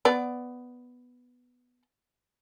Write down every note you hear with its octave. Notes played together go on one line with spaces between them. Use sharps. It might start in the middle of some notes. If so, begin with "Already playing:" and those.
B3 D5